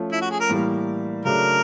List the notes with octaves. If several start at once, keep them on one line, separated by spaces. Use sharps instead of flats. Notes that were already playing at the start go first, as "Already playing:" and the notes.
Already playing: F3 A3 C#4
E4
F#4
G#4
A#4
A2 E3 G3 A#3
C#3 F#3 A3 D4 A#4